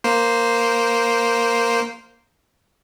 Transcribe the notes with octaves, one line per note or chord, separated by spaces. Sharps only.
A#3 C5